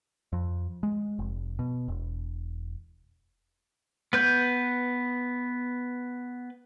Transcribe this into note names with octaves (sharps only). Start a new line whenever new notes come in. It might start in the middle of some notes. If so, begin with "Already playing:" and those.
F2
G#3
F1
B2
E1
B3 B4 G6